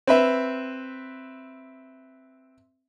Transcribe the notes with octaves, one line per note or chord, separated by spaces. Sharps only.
C4 B4 E5